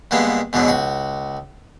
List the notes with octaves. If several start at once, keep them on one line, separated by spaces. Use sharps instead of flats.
G2 D3 G#3 A#3 B3
E2 G#2 B2 D3 F#3
C#2 F#4